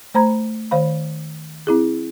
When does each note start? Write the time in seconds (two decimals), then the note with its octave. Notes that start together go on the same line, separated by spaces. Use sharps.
0.14 A3 C5 A#5 B5 G#6
0.71 D#3 C5 F5 B5
1.67 C4 E4 G#4